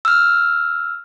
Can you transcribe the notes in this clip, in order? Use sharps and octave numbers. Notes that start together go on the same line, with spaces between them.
E6 F6